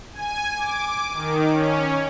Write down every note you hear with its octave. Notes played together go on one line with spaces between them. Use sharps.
G#5
D6
D#3
C#4